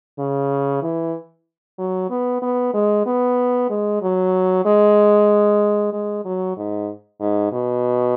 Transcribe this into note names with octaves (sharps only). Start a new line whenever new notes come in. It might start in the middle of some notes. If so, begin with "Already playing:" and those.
C#3
E3
F#3
B3
B3
G#3
B3
G#3
F#3
G#3
G#3
F#3
G#2
G#2
B2